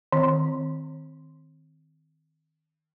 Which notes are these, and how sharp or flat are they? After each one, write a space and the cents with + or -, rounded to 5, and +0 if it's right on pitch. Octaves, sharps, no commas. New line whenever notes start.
D#3 +0 C4 +0